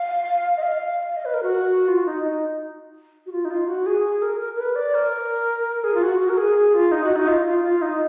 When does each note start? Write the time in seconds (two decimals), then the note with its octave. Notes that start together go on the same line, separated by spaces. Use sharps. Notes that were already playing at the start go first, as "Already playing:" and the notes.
Already playing: F5
0.57 D#5
0.63 F5
1.17 D#5
1.25 B4
1.34 A#4
1.43 F#4
1.88 F4
2.06 D#4
2.24 D#4
3.26 F#4
3.32 F4
3.45 D#4
3.51 F4
3.68 F#4
3.86 G#4
4.04 G#4
4.22 A#4
4.41 A#4
4.54 A#4
4.58 B4
4.76 D5
4.94 A#4
5.84 G#4
5.94 F4
6.03 F#4
6.20 F#4
6.29 A#4
6.37 G#4
6.56 G#4
6.74 F4
6.92 D#4
7.04 F#4
7.16 D#4
7.28 F4
7.46 F4
7.64 F4
7.82 D#4